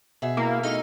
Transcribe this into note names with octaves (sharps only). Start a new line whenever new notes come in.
B2 G#4 E5
A#3 E4
A3 D#4 F6